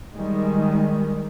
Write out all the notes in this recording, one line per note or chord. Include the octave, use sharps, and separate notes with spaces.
D#3 G3 G#3